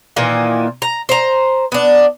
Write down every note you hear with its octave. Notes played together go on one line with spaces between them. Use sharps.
A#2 D#3 E3 A#3
A#5
C5 A#5
B3 D4